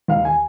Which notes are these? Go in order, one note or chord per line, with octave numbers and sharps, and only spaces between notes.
D#2 F5
G#5